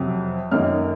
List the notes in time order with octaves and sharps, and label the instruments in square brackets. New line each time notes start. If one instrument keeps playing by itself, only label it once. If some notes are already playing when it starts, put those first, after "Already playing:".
Already playing: [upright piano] F2 C3 F#3
F#2 D#3 A#3 D#4 F6